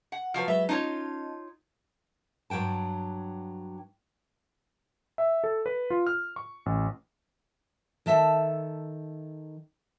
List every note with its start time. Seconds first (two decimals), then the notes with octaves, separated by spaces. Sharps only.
0.12 F#5
0.34 F3 F#3 B4 A5 F6
0.48 F#3 G#3 B4 E5
0.69 C#4 D#4 F4 C#5 D#5 A5
2.50 G2 F#3 D4 G5 A5
5.18 E5
5.44 A4
5.66 B4
5.90 F4
6.07 F6
6.36 C#6
6.66 A1
8.06 D#3 A4 E5 G#5 A5